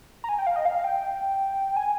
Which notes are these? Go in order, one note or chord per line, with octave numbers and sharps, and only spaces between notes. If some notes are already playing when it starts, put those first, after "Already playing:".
A#5
G#5
G5
F5
D#5
F5
G5
G#5